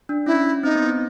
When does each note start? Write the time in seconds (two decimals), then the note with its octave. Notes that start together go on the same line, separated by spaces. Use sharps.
0.09 D4
0.26 C#4 E4
0.63 C4 D#4
0.75 B3
0.88 C4